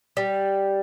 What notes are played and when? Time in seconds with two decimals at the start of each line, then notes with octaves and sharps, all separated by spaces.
0.17 G3